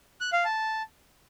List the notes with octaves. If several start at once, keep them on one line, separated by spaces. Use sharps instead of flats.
F#6
F5
A5